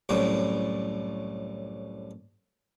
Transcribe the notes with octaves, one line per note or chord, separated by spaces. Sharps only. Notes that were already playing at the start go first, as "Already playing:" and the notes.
C2 F#2 A2 G3